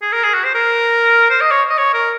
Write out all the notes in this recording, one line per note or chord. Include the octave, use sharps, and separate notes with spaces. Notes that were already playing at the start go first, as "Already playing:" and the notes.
G#4
A#4
G#4
F#4
C5
A#4
C5
D#5
C#5
D#5
C#5
A#4